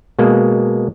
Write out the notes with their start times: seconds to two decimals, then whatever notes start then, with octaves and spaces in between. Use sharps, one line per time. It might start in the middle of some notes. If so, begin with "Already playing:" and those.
0.19 B2 G#3 A#3